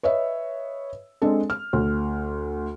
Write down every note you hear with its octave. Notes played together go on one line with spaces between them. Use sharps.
B4 C#5 D#5 E5
G#3 C4 D4 A4
F6
D2